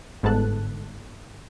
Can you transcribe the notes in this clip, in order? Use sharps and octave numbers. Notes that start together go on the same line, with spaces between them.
G1 G#2 B3 A4 A5 F#6